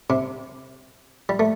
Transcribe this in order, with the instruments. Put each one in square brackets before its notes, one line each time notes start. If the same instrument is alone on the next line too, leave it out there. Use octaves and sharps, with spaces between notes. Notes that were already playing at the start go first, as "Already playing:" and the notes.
[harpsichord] C3
G3
A3